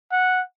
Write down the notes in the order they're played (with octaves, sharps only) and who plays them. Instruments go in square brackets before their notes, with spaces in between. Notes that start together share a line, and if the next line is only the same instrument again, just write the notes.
[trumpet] F#5